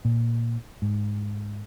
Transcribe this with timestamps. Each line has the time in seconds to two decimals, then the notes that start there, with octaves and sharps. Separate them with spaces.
0.05 A#2
0.82 G#2